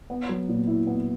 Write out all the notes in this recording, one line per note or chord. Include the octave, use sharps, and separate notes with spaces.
B3
F#3
A#2
E4
B3